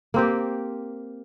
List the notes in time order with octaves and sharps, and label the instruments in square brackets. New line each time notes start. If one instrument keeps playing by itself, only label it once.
[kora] A#3 C4 G4